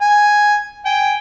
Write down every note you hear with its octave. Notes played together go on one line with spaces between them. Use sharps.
G#5
G5 G#5